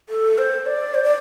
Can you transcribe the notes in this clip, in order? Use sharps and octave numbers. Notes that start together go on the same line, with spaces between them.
A4
C5
D5
C5
D5